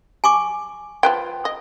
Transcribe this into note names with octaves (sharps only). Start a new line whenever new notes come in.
G#5 C#6 D6
F3 B4 G5
D#5